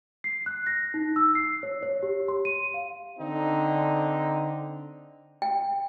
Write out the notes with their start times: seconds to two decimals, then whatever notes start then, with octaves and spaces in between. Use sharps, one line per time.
0.24 C7
0.46 F#6
0.67 A#6
0.94 D#4
1.16 E6
1.35 C7
1.63 C#5
1.83 C#5
2.03 G4
2.28 C6
2.45 D#7
2.74 F5
3.19 D3 C4 D#4
5.42 G5